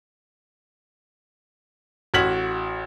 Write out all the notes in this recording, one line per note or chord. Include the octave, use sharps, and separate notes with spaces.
A1 F#4 F6 G#6 B6 F#7